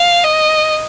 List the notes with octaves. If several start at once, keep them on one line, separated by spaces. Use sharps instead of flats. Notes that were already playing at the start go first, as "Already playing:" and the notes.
Already playing: F5
D#5